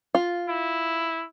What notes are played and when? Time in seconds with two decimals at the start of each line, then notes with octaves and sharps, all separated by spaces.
0.15 F4
0.48 E4